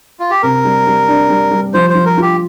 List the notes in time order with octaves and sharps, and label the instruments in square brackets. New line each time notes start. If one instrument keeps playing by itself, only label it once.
[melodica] F4
G4
[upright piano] C3 [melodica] A#4
[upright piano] G3
G3
D4
G3
G3
[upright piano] F3 [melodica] C5
[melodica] C5
[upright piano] F3
[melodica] A#4
[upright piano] F4 [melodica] G4